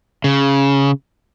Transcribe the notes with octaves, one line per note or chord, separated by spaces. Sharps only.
C#3